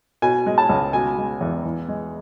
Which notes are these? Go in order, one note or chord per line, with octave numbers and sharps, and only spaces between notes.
B2 G#5
G#3
A5
C#2
B2 G#5
G#3
E2
E3
G#3